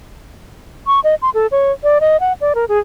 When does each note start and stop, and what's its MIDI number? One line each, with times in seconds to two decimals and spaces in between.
0.87 1.00 85
1.04 1.15 75
1.22 1.30 84
1.34 1.47 69
1.51 1.72 73
1.83 1.98 74
2.01 2.17 75
2.20 2.33 78
2.41 2.53 74
2.55 2.65 70
2.69 2.79 68